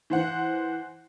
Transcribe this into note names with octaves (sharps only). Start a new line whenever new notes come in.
E3 C5 F#5